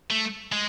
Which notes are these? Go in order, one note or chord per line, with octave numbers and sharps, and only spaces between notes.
A3
G#3